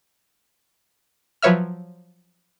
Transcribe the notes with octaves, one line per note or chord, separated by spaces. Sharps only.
F3 F#3 B4 C#5 E5 F6